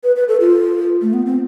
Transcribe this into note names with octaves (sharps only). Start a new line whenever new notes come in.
B4
B4
A4
F4
A3
B3
C4